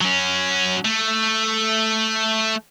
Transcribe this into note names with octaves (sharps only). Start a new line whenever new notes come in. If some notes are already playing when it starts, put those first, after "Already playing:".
F#3 C#4
A3